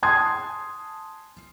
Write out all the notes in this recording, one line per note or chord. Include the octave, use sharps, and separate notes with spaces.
G#5 A5 C6 D#6 G#6